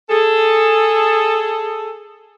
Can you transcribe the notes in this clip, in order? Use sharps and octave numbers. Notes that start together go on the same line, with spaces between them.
G#4 A4